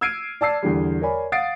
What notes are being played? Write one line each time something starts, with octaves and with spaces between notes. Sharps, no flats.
E6 F6 G#6 C7 D7 D#7
D5 A5 E6 C7
E2 D3 G3
A#4 C#5 D5 G#5 B5
F5 F#5 D#6 A6 C7 D7